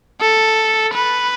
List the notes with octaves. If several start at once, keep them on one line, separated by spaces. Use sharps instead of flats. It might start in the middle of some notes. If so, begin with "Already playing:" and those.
A4
B4